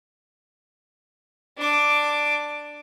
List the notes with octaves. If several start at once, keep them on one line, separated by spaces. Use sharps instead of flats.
D4 D6